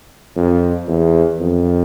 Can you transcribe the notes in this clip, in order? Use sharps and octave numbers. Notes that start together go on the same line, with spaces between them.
F2
E2
F2